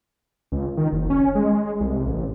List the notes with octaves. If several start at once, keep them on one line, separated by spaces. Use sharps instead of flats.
C#2
D#3
F#1
C#4
G#3
C2
A1